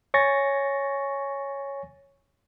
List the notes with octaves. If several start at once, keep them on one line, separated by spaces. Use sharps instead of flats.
C#5 G#5 C#6 A6 A#6